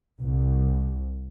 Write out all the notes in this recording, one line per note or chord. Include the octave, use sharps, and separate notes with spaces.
C2